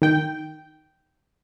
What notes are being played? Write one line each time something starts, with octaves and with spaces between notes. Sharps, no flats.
D#3 G5